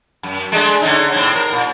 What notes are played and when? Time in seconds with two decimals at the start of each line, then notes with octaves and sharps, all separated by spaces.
0.23 F#2
0.52 G#3 A3 D4
0.82 D3 C#4 D#4
1.12 A2 C4
1.36 A#4
1.53 A#2